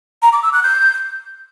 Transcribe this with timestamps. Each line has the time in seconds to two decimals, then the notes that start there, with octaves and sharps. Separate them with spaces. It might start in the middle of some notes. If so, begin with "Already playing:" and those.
0.22 A#5
0.33 D6
0.43 E6
0.53 F#6
0.63 G6